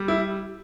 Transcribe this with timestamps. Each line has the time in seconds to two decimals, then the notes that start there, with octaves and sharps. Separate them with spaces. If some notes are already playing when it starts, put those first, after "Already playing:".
Already playing: G3
0.08 E4